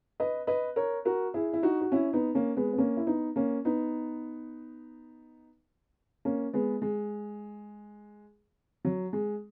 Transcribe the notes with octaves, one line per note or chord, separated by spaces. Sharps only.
B4 D#5
B4 D#5
A#4 C#5
F#4 A#4
E4 G#4
E4
D#4 F#4
F#4
C#4 E4
B3 D#4
A#3 C#4
G#3 B3
B3
A#3 C#4
E4
B3 D#4
A#3 C#4
B3 D#4
A#3 C#4
G#3 B3
G#3
F#3
G#3